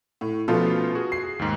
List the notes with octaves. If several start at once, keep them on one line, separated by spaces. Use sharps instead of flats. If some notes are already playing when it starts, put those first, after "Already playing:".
A2
B2 F3 A3 B3 C#4 F4
F#4 G#4
C7
D#2 G#2